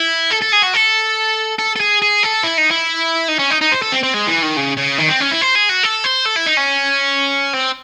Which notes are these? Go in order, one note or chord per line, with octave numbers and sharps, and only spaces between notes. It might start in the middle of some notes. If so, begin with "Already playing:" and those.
Already playing: E4
A4
A4
G#4
F#4
A4
A4
A4
G#4
G#4
A4
E4
D#4
E4
D#4
C#4
D#4
D#4
C5
A4
C4
C4
G#3
E3
D#3
C#3
C#3
D#3
C4
C#4
E4
C5
G#4
F#4
A4
C5
A4
E4
D#4
C#4
C4